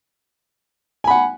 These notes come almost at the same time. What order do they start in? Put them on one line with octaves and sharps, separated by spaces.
G#5 B5 F#5